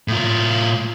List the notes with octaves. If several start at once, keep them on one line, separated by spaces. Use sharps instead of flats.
A2 F4